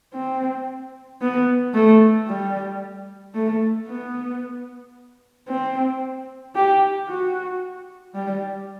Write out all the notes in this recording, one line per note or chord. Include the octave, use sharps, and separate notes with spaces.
C4
B3
A3
G3
A3
B3
C4
G4
F#4
G3